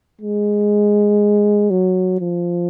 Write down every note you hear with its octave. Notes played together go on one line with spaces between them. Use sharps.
G#3
F#3
F3